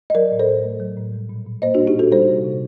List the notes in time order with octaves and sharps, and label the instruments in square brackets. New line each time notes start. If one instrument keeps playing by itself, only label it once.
[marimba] D#5
F#3 A#4 D5
A2
A4 C5
A2
A3
F#3
A2
G3
A#2
A#2
A#3 C5 D#5
D4 F#4
G3
D#4 G4
A#2 F#4 A4
G3 A4 C5
C3
C3